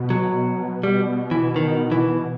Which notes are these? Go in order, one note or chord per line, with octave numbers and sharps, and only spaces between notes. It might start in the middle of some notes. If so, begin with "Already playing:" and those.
Already playing: B2
F#3
G3
E3
D#3
E3